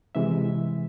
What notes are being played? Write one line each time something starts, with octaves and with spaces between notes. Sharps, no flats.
C3 E3 G#3 E5